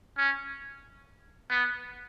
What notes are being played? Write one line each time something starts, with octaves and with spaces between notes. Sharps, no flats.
C#4
B3